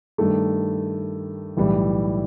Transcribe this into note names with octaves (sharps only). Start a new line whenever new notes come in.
G2 D#3 A3
B1 A2 E3 G3